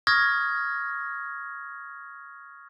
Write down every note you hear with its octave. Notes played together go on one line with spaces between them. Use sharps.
C#6 D#6 F6 G#6 A#6